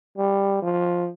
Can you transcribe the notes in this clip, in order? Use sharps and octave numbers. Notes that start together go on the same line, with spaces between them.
G3
F3